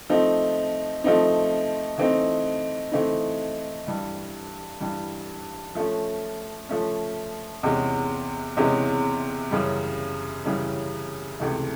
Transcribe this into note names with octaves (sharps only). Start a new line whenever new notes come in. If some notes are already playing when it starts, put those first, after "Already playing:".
F3 A3 C4 D#4
F3 A3 C4 D#4
E3 A3 C4 D#4
E3 A3 C4 D#4
G2 E3 G3
G2 E3 G3
F3 A3 C#4
F3 A3 C#4
E2 C3 E3 G#3 C#4
E2 C3 E3 G#3 C#4
F#2 C#3 E3 G3
F#2 C#3 E3 G3
C#2 C3 E3 A3